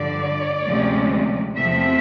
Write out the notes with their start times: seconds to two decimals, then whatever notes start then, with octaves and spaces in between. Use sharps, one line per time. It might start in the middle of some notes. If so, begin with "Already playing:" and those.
Already playing: G2 D3 F3 D5
0.65 D2 C3 F3 G#3 C#4
1.55 E2 C3 F3 A3 C4 E5